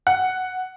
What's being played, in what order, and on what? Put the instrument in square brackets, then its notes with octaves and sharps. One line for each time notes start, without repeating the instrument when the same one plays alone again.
[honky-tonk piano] F#5